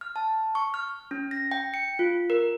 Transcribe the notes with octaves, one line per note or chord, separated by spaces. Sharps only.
F6
A5
C#6
F6
C#4
A#6
G5
C#7
F4
A#4